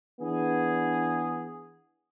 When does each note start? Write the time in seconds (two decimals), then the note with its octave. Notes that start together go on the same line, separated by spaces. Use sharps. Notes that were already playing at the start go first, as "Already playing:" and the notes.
0.20 E3 B3 D4 G#4